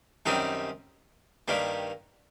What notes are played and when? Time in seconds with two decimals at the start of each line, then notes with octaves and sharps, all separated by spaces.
0.26 F#2 D#3 G3 C4 D#4
1.48 G2 D#3 G3 A#3